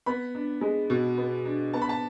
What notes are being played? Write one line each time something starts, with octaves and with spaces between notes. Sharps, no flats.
B3 B5
D4
G#3
B2
B3
D4
B3 A5
B5
A5